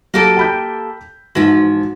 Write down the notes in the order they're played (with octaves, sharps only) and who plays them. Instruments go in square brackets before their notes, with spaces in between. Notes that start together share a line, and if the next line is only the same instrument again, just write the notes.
[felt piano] F#3 [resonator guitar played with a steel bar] A#3 G4 A4
[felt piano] G5 B5 G6
[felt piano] G#2 F#4 [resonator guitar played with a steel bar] E3 F3